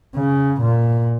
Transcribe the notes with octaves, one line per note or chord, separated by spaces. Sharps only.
C#3
A#2